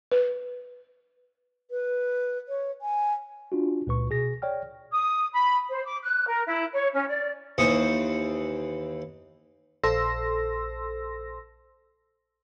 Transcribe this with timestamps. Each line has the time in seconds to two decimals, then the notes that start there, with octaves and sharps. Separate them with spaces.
0.12 B4
1.71 B4
2.48 C#5
2.82 G#5
3.52 D4 F4 F#4
3.87 C#2 A#2 B4 C#6
4.10 B2 G#4 A#6
4.42 C#5 D5 G5 F6
4.92 D#6
5.33 B5
5.69 C5
5.83 D6
6.02 F#6
6.26 A#4
6.47 E4
6.72 C#5
6.94 C#4
7.07 D5
7.58 D#2 E3 C5 C#6 D#6
9.83 A#1 A4 C5 C6 E6 A#6